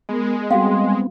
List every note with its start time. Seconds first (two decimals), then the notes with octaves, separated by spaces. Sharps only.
0.09 G#3 B3 A#4
0.51 G3 B3 C4 F#4 A4 F5 C6